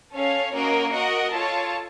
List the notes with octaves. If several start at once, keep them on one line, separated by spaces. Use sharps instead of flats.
C#4 A4 C#5 F5
A#3 C#4 F#4 A#4 D#5
F#4 A#4 D#5 F#5
F4 A4 C#5 A5